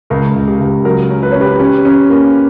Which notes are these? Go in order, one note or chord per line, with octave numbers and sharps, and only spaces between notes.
C#2 A#4
C#2
G4
C#2
F#3 A#4
C#4
B4
C#4 C#5
G4 B4
C#4
C#4
A#3